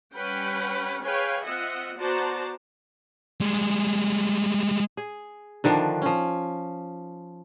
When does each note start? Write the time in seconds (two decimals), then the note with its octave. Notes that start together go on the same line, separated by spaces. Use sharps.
0.16 G3 C#4 B4 F#5 G5
1.04 G#4 B4 C#5 F5 G5 G#5
1.45 C4 F4 D#5 E5 F#5
1.97 B3 F#4 C5 D5 A5 A#5
3.41 G3 G#3
4.97 G#4
5.64 D3 D#3 F3 D4
6.02 F3 C#4